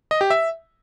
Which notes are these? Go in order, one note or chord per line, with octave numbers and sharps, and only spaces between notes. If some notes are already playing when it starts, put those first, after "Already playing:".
D#5
G4
E5